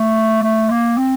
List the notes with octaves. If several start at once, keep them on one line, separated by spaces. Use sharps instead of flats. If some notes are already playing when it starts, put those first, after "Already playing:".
Already playing: A3
A3
A#3
C4